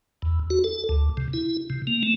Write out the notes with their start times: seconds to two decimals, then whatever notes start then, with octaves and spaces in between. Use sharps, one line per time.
0.22 E2
0.50 F#4
0.64 A4
0.89 D2
1.17 C3
1.33 E4
1.70 C3
1.87 A#3
2.03 A3